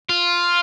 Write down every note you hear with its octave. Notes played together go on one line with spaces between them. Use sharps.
F4